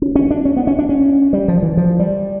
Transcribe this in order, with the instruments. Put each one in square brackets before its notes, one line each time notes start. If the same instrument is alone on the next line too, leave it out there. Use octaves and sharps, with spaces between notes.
[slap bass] C#4
C#4
D4
C#4
B3
C#4
D4
C#4
G3
F3
E3
F3
G3